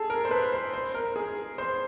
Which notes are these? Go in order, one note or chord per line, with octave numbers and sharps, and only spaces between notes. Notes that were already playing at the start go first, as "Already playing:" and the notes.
Already playing: G#4 A4
A#4
C5
B4
C5
C5
A#4
G#4
C5